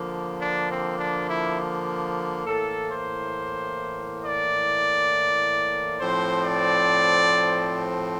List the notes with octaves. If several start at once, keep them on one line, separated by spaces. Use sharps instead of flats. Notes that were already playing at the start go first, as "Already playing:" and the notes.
Already playing: D3 F3 A#3
D4
C4
D4
E4
A2 E3 A#3 A4
C5
D5
A2 F3 C4 C5
D5